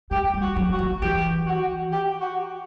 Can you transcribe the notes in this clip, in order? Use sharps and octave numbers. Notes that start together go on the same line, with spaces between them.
G#3 G4
G3
F#4
F#3
F#4
F3
E3 G4
F#4
G4
F#4